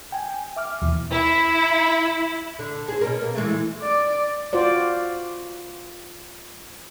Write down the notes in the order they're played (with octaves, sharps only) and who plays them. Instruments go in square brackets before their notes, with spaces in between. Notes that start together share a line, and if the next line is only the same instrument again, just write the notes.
[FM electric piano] G5 G#5
E5 D6 F6
D#2 B2 E3
[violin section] E4
[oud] D3
G#4 C5
B2 C#4 A#4
A#3
E3 G#3 A3
[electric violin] D5
[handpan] F4 F#4 C5 D5